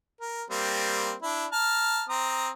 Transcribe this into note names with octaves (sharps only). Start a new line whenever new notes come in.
A#4
G3 A#3 C4
D4 E4
A5 A#5 F6
C4 A#5 D#6